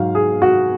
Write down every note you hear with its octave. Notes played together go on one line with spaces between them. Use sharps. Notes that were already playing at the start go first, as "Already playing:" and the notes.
Already playing: G#2 F#3 F5
G#4
F#4